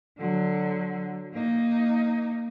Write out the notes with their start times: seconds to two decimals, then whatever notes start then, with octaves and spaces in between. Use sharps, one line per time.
0.18 D3 F#3
1.33 A#3 D#4